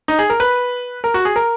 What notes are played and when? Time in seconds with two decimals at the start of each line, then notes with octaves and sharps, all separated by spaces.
0.08 D#4
0.19 G#4
0.30 A#4
0.40 B4
1.04 A#4
1.14 F#4
1.25 G#4
1.36 A#4